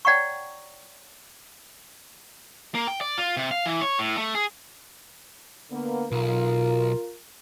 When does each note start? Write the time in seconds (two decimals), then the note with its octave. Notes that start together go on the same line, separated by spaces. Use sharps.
0.05 C#5 D5 F#5 G5 A#5 C#6
2.75 A#3
2.87 G5
3.01 D5
3.18 F4
3.37 C3
3.51 F5
3.66 E3
3.81 C#5
3.99 A2
4.18 A3
4.35 G#4
5.71 D3 A#3 B3
6.11 B1 F4 A#4